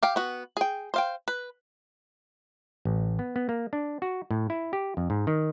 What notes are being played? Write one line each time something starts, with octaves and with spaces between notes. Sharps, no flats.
G4 F5 G5
B3 F#4
G#4 G5
C5 F5 G5
B4
A1
B3
B3
A#3
D4
F#4
A2
E4
G4
F2
G#2
D#3